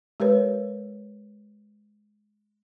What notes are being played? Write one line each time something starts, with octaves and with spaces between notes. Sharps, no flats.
G#3 G4 A#4 B4 C#5